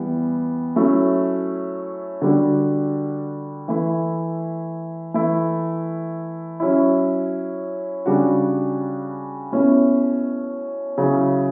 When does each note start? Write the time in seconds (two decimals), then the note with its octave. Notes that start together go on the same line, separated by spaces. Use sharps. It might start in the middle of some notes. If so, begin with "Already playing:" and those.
Already playing: E3 G3 B3
0.76 F#3 A3 C#4 E4
2.22 D3 G3 D4 F#4
3.68 E3 A3 E4
5.14 E3 A3 E4
6.60 F#3 C#4 E4
8.06 C#3 G3 D4 F#4
9.52 B2 A3 C#4 E4
10.98 C#3 F#3 C#4 E4